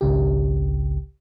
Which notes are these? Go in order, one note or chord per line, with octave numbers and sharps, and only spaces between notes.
G#1 C#2 C#3 G4